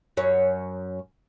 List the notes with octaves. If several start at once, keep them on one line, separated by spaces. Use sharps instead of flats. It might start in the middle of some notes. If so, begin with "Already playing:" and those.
F#2 C#5